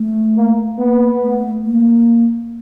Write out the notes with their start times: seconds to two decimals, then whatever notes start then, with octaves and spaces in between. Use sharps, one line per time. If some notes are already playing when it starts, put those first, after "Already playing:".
Already playing: A3
0.36 A#3
0.79 A#3 B3
1.21 A3
1.64 A#3